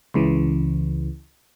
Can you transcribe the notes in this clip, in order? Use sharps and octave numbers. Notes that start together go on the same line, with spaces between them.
C#2 C#3 E3